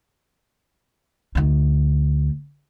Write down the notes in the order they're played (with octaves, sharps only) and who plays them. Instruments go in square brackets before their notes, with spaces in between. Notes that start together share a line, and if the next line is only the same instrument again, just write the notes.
[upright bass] D2 D#4